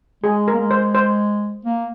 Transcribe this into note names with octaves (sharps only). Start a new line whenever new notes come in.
G#3 G#4
A#4
A#3
G#3
C5
C5
A#3